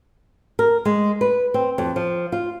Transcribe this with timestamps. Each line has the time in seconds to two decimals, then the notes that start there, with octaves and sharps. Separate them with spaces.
0.59 A#4
0.85 G#3
1.21 B4
1.54 C4
1.78 F2
1.96 F3
2.32 F4